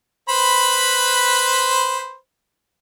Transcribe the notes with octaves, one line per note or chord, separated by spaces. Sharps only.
B4 C5 B5